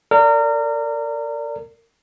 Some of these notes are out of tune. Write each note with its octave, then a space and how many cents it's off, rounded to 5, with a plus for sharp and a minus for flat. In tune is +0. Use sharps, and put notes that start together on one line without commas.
A#4 -30 D5 -10